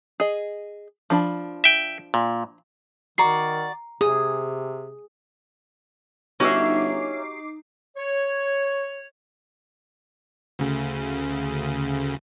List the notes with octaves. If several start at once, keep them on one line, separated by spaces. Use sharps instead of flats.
G#4 D#5
F3 D4 B5
E5 G5
A#2
D#3 F#4 D5 A#5 C7
C3 G#4 D#6
G1 C#4 D#4 F#4 G4 E5 D6 C7
C#5
D2 C#3